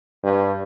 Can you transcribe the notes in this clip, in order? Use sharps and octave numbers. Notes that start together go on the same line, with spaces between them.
G2